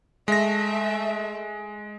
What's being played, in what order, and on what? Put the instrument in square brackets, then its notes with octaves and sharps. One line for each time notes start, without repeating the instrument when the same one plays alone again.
[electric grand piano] G#3 A#6 [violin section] A3 E5